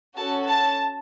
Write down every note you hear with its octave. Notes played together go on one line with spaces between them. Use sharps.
C#4 F#4 A4 A5
A5